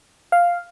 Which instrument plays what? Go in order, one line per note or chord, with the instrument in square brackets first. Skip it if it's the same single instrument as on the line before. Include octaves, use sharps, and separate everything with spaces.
[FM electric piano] F5